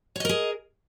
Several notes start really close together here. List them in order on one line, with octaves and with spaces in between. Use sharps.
C#5 D#5 A#4 G#4